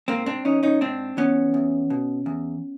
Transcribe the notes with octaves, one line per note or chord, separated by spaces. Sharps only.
G#2 A#3 C4
C4 D4
E3 C#4 D#4
C#4 D#4
G#2 C4 D4
E3 B3 C#4
E2
B2
E2